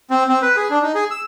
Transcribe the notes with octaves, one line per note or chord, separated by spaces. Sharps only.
C4
C4
B4
G#4
D4
D#4
G#4
E6